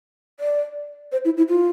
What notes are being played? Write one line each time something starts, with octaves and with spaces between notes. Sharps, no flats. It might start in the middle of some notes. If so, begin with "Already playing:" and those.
D5
C5
E4
E4
F4